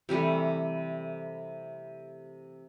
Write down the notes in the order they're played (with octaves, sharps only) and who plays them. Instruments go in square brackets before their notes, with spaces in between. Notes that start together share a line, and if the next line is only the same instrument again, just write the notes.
[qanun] C3 E3 G3 A3